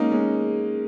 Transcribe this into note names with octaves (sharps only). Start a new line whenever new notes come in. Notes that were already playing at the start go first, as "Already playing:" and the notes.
Already playing: G#3 A#3 C#4 D#4
G#3 C#4